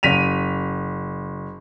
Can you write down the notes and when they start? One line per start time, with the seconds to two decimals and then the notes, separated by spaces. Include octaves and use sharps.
0.03 F#1 B6 D#7 F7